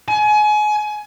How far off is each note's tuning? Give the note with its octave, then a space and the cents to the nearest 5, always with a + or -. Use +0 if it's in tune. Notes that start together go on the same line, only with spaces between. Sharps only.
G#5 +30